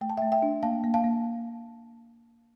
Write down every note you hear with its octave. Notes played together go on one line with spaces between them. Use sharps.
A3 G5
A5
E5 G5
A3
E5 G5
D4
A#3 F5 A5
A#3
F5 A5
A#3